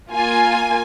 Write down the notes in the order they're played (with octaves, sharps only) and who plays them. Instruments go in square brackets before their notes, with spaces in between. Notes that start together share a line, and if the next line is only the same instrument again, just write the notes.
[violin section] A#3 F4 G#5